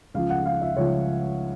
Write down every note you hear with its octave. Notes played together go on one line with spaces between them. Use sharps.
C#2 C#3 F3 F5
F#5
F5
E5
C#2 C#3 F3 C#5